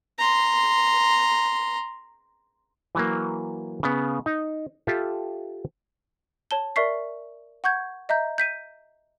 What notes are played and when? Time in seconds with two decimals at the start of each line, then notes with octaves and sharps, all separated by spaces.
0.19 A#5 C6
2.95 E3 F#3 A#3
3.83 C#3 B3
4.26 D#4
4.87 F4 G4 A4 E5
6.51 C#5 A5 G7
6.76 A#4 D5 E5 C#6 B6 C7
7.64 F#5 C#6 G6 G#6
8.09 D#5 E5 A#5 G6
8.38 G6 B6 D#7